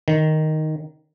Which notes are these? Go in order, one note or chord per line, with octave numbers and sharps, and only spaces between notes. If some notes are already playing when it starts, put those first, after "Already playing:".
D#3